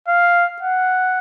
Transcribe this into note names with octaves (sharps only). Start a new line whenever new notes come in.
F5
F#5